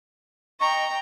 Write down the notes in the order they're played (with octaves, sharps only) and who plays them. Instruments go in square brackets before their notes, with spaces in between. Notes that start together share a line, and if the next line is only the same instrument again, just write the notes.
[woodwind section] D#5 C#6 [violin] G5 A#5